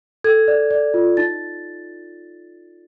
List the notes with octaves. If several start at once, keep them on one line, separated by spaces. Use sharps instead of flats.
A4 G#6
D5
D5
F4
D#4 A6